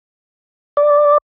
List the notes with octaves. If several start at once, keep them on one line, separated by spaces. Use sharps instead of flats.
D5